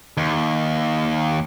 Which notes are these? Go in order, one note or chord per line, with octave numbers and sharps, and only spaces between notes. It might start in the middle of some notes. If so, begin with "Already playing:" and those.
D#2